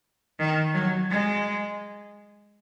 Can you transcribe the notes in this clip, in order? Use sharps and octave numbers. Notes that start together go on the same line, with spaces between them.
D#3
F#3
G#3